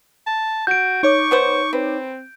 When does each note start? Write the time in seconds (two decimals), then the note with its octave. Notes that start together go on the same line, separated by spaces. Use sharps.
0.26 A5
0.67 F#4 G6 D7
1.03 D#4 C#5 C#6 D6
1.31 B3 B4 C5
1.73 C4 B4